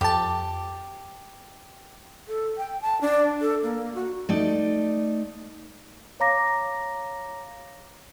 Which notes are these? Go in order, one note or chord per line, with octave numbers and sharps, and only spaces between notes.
F2 G4 A5
A4
G5
A5
D4
A4
A#3
F#4
A3 D#4 D5
C#5 F5 A#5 D6 A#6